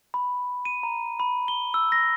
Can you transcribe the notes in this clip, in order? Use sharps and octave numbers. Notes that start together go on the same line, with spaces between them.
B5
D#7
A#5
B5
G7
E6
A#6